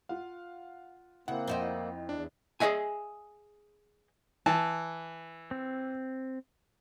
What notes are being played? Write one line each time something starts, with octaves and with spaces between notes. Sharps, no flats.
F4 F5 F#5
C#3 A#3 C4 E4 F#5
F2 D#4 E4 C5
E2 D4
G#4 B4 D#5 E5 G#5
E3 A5
C4